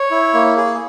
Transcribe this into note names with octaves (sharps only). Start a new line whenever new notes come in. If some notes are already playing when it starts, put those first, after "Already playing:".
Already playing: C#5
E4
A#3
G#4